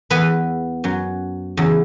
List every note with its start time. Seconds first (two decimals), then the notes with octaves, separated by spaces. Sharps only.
0.10 E2 E3 B3 B4
0.84 F#2 F#3
1.57 E2 C#3 F#3